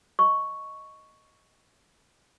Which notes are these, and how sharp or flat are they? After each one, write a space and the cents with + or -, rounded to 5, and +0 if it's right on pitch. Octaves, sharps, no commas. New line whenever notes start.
D#5 +0 C#6 +0